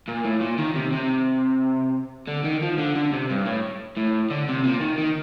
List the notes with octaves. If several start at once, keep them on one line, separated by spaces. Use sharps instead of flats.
A#2
A2
A#2
D#3
C3
C3
D3
D#3
F3
D3
D3
C3
G2
A2
A2
D3
C3
A#2
D#3
D#3